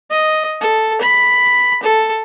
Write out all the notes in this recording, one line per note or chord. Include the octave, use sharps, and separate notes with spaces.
D#5
A4
B5
A4